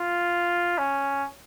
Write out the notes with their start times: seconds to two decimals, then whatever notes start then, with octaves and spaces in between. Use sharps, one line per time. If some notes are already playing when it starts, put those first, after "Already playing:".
Already playing: F4
0.78 C#4